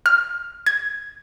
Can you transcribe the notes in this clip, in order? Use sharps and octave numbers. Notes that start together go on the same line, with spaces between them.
F6
G#6